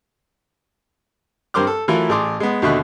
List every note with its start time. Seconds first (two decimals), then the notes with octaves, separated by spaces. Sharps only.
1.54 G2 C4 A#4 C6 D6 F6
1.67 A4
1.88 E3 F#3 A3 E4 F4 A#4
2.09 A1 G#4 A5 C6 D6
2.40 G#3 B3
2.62 D#2 B2 D3 E5 C#6 F#6